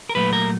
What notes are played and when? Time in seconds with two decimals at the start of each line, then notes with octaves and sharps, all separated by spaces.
0.09 A#4
0.15 A#2 F#3 A3 B4
0.33 A#4